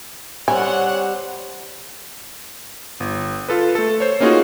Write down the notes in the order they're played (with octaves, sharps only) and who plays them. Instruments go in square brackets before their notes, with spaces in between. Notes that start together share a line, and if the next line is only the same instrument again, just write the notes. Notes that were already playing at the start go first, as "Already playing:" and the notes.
[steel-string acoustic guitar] G3 C4 [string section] C#5 F#5 [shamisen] G#5
[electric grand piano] G1
F4 A4 B4
A3 A4
C5 C#5
A#3 C#4 D#4 F4 F#4 G#4